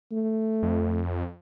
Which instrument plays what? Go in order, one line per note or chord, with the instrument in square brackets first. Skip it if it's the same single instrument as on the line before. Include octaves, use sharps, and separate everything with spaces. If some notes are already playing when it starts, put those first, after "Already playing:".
[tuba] A3
[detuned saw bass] F2